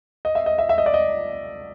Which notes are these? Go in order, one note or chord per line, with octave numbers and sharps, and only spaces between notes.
D#5
E5
D#5
E5
E5
D#5
D5
D#5